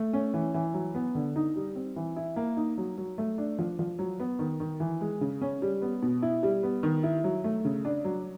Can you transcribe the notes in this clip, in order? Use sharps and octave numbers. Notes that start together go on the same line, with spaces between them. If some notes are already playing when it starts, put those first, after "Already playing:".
Already playing: A3
C#4
E3
E3
F#3
B3
D3
D#4
G3
C4
E3
E4
A#3
D#4
F#3
F#3
A3
D4
F3
F3
F#3
B3
D#3
D#3
E3
G#3
C#3
C#4
G3
B3
B2
E4
G3
B3
D#3
E4
F#3
A3
C#3
D4
F#3